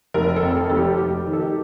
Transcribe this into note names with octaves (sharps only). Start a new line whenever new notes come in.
F1 A#4
A4
F2
A4
F1 A4
G4
F1 G4
D#3
A4
G4